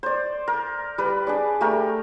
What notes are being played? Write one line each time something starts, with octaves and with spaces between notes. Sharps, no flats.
C5 D5
A#4
G3 B4
D4 G#4 D5
A3 G4 A#4